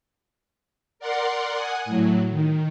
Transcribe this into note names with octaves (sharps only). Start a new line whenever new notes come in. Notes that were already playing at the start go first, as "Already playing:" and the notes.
A#4 D5 F#5 C6
F#5 G#5 D#6
A2 F#3
D#3